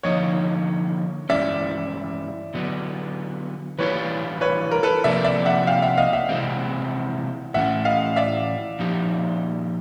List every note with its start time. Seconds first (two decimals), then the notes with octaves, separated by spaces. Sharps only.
0.03 D3 F3 A#3 D#4 C#5 D#5
1.29 G2 E3 G#3 C#4 D5 E5
2.54 D3 F#3 B3
3.79 E3 G3 A#3 D4 F4 B4 C#5
4.41 B4 C#5
4.71 A#4
4.83 A4 B4
5.04 C3 F3 A#3 D4 D5 E5
5.24 D5 E5
5.45 E5 F#5
5.67 F5 G5
5.82 E5 F#5
5.97 D#5 F5
6.13 E5 F#5
6.29 C3 E3 G#3 C4
7.54 A2 E3 A3 C#4 E5 F#5
7.85 D#5 F5
8.16 D5 E5
8.79 A#2 F3 A#3 D#4 G4